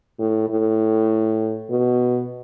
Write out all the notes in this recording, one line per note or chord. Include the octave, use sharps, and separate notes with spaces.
A2
A2
B2